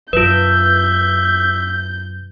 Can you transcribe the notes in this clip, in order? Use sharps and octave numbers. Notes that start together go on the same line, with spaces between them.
F#2 B2 F4 B4 E5 G6